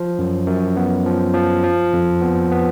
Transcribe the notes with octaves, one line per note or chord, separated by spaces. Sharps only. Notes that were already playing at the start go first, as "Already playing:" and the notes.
Already playing: F3
F#2
F#2
B3
F3
F3
F3
F2
B3
B3